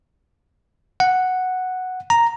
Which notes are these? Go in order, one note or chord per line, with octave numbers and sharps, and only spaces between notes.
F#5
A#5